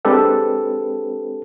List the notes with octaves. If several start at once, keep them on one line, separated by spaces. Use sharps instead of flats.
G#3 C4 D4 G4 A4 B4